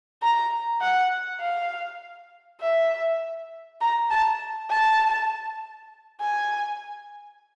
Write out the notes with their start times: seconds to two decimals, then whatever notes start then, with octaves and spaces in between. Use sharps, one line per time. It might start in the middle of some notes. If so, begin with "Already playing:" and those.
0.22 A#5
0.81 F#5
1.41 F5
2.61 E5
3.81 A#5
4.11 A5
4.70 A5
6.21 G#5